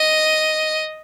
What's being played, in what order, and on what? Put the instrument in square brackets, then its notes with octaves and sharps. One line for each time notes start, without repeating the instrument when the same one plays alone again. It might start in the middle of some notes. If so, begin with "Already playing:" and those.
Already playing: [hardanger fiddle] D#5